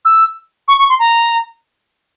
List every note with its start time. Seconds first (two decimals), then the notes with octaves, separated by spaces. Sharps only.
0.05 E6
0.68 C#6
0.79 C#6
0.89 C6
0.99 A#5